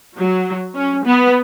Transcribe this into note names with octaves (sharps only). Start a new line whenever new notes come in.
F#3
C#4
B3